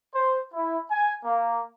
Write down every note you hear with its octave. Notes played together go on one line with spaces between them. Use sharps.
C5
E4
G#5
A#3